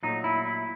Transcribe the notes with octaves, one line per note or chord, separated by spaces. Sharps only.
A#2 F#3 A3 D#4
E4
E4